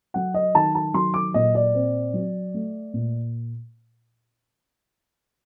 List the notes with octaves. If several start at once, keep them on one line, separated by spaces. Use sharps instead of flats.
F#3 F#5
D#5
D#3 A5
A5
F#3 C6
D6
A#2 D#5
D5
C4
F#3
A3
A#2